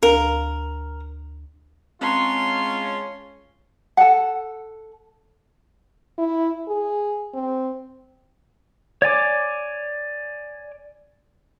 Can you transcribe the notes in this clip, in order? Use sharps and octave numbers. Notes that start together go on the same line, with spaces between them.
D2 A#4 F5
G#3 C4 C#4 F4 C#5 A5 A#5 C6
A4 F#5
E4
G#4
C4
C#5 D5 G#5 D6